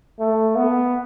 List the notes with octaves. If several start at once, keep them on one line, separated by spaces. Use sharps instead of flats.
A3
B3